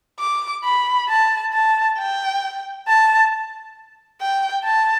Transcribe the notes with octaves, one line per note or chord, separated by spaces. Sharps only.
D6
B5
A5
A5
G5
A5
G5
A5